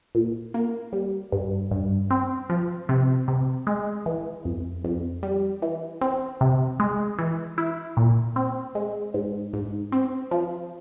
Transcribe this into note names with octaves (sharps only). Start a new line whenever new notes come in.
A#2
A#3
G3
G2
G2
C4
F3
C3
C3
G#3
E3
F2
F2
G3
E3
C4
C3
G#3
E3
E4
A#2
C4
G#3
G#2
G#2
C4
F3